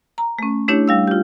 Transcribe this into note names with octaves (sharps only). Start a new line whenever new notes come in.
A#5
A3 C#4
A3 D4 E4 G4 C#5
G3 F5 E6
F4 G4